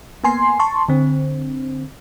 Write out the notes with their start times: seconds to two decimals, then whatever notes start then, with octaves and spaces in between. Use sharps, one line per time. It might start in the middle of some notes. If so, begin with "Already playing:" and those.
0.24 A#3 B3 G#5 C6 C7
0.59 A5 C6 C#6
0.89 D3 C4